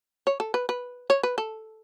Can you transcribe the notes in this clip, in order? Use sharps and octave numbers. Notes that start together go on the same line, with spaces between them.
C#5
A4
B4
B4
C#5
B4
A4